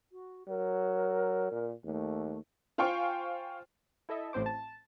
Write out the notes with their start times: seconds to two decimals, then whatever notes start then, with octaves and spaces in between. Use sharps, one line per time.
0.12 F#4
0.48 F#3 A#4
1.52 A#2
1.84 D#2 A3
2.78 F4 C5 F5 G5 G#5 C#6
4.09 E4 A4 D#5 E5
4.33 A1 A2 C4 C5 D6
4.46 A5